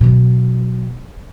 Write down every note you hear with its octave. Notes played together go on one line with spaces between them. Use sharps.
B2 F#3